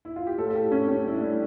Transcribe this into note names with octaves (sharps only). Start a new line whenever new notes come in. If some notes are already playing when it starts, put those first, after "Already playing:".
E4
F4
G4
A2 A4
A4
A2 G4
A2 C#4
A2 C#4
G3 E4
D4
A2